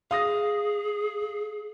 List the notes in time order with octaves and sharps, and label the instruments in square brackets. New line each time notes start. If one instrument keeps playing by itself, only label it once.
[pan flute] G#4 [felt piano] F5 D#6 A#6